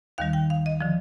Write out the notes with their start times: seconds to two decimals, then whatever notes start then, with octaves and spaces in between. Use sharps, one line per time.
0.18 D#2 D#3 G3 F5
0.33 G5
0.50 F5
0.66 D#5
0.81 D3 F3